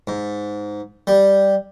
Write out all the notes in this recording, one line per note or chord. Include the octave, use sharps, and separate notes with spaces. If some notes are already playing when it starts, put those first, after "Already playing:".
G#2
G3